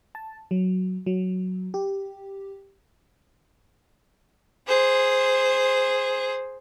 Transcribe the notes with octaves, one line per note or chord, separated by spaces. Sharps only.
A5
F#3
F#3
G4
G#4 C5